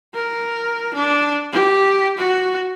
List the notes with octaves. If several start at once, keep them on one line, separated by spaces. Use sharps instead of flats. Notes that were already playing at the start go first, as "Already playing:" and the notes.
A#4
D4
G4
F#4